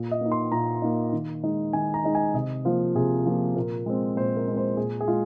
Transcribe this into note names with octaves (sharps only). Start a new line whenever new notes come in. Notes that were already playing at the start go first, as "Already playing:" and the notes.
Already playing: A#2
D#5
A#3 D#4
C6
A#2 A#5
A#3 D#4
D#3
G#3 D#4
D#3 G#5
A#5
G#3 D#4
G#5
C3 D#5
F3 A#3 F4 C5
C3 G#4
F3 A#3 F4
A#2 A#4
G#3 C4
A#2 C5
A#4
G#3 C4
C5
A#2 G#4
G#4
G#3 F4